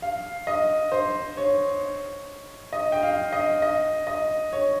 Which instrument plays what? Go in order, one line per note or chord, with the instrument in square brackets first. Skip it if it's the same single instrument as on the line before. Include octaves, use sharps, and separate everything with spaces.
[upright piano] F5
D#5
C5
C#5
D#5
G5
F5
D#5
D#5
D#5
C#5